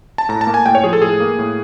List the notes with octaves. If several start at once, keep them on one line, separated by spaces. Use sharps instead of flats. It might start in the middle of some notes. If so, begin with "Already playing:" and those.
A5
A2 A#5
A5
A#3
G#5
A2 G5
C#5
F3 G#4
A4
A2 G#4
A#3
A2